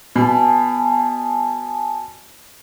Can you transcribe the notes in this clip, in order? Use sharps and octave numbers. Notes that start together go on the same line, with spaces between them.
B2 G#5 A5